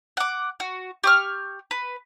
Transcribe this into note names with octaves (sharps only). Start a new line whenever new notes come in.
F#5 D6
F#4
G4 C#6 F6
B4